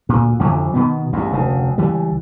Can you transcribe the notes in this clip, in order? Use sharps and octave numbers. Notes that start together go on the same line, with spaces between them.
D2 A#2
A1 F2 D3 F3
B2 D#3 B3
A1 E2 G2
F1 D2 C#3
C#2 E3 G3